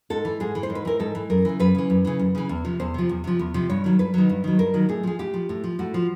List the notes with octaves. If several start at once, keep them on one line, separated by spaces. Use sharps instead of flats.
G#2 A4
E3
G#2 G#4
E3
C5
G#2
B4
E3 A#4
G#2 A4
E3
F#2 A#4
C#3 E3
F#2 B4
C#3 E3
F#2
C#3 E3
F#2
C#3 E3
E2
C3 F3
E2 C5
C3 F3
E2
C3 F3
E2
C3 F3
G2 C#5
D#3 F#3
G2 B4
D#3 F#3
G2
D#3 F#3
G2 A#4
D#3 F#3
A2 G#4
F3 G#4
A2 G4
F3
A2
F3
A2 F#4
F3